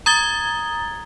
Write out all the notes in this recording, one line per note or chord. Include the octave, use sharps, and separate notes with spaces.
A#5 D#6 G#6 A6 G7